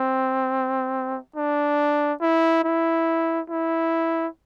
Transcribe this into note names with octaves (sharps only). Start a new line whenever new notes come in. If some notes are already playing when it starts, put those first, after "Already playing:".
Already playing: C4
D4
E4
E4
E4